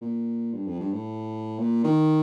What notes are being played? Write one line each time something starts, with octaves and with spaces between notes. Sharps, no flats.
A#2
G2
F2
G2
A2
A#2
D#3